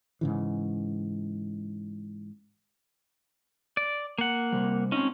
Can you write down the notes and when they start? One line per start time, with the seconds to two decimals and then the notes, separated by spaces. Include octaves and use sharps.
0.21 G#2 C#3 E3
3.77 D5
4.18 A#3 F#5
4.52 C3 G3
4.92 C4 C#4 D#4